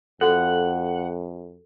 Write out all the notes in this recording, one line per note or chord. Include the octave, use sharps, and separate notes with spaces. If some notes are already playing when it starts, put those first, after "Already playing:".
F2 F#4 A4 F#5